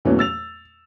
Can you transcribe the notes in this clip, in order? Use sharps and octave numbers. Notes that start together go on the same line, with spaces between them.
E2 A#2 E3 F#3 A3 C#4
E6 A6 F7